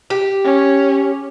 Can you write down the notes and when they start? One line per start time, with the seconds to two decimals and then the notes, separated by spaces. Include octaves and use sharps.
0.10 G4
0.45 C#4